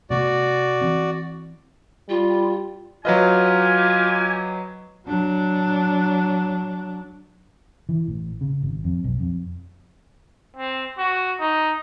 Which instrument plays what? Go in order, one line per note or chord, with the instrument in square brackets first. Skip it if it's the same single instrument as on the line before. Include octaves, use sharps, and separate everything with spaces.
[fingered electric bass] C3 A3 B3 [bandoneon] F#4 D5
[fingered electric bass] E3 C4
[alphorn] G3 [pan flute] F4
[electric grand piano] F#3 B4 D#5 [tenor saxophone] F4 [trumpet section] G4 G#5
[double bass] F#3 D4
[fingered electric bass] E3
A1
C#3
G#1
F2
B1
F2
[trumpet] C4
F#4
D#4